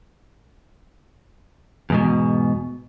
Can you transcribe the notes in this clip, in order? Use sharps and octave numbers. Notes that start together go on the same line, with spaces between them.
E2 G#2 B2